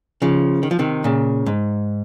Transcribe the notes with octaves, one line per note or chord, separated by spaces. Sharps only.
C#3 F3
D#3
F3
C3 D#3
A#2 C#3
G#2